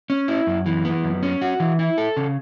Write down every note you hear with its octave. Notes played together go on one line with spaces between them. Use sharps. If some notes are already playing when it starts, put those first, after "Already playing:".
C#4
E4
F#2
E3
B3
F#2
C#4
F#4
E3
E4
A4
C#3